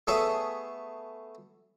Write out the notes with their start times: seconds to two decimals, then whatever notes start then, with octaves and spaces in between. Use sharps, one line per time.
0.07 A3 B3 G#4 A4 C#5 E5